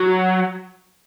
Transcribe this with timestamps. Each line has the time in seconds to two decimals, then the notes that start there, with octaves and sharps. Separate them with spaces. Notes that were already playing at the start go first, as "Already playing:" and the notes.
Already playing: F#3